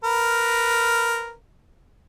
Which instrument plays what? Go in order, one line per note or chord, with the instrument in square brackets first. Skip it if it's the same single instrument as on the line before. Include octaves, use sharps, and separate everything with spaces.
[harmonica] A#4 B4